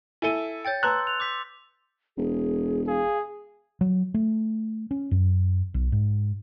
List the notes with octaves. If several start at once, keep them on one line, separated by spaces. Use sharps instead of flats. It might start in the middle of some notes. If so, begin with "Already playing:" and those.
E4 A4 G#5 D#7 G7
C#5 G5 G6 A6 C#7
B4 A5 A#5 C6 E6 F#6
F7
D6 G6 B6
E1 G#4
G#4 F5
F#3
A3
C#4
F#2
B1
G#2